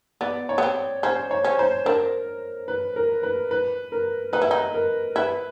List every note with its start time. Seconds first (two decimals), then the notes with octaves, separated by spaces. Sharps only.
0.21 B3 D5
0.49 C#5
0.58 B3
0.63 C4
1.03 C#4 C5
1.31 C#5
1.44 C#4
1.59 C5
1.86 D4 A#4
2.68 B4
2.96 A#4
3.23 B4
3.51 B4
3.92 A#4
4.33 D#4 B4
4.42 E4
4.51 D#4
4.74 A#4
5.16 E4 B4